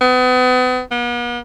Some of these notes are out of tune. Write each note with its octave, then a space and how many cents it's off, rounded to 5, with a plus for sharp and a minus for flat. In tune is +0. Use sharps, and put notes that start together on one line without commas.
B3 +35
B3 -45